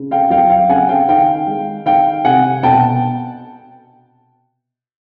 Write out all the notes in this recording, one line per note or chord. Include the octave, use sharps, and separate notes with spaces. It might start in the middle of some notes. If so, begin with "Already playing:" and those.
Already playing: C#3
F5 G5
F#3 F5 G5
F5 G5
C#3 F#5 G#5
F5 G5
D#3 F5 G5
G#3
D#3 F5 G5
C3 F#5 G#5
B2 G5 A5